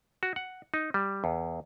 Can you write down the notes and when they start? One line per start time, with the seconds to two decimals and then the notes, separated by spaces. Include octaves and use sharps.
0.23 F#4
0.36 F#5
0.74 D#4
0.94 G3
1.24 E2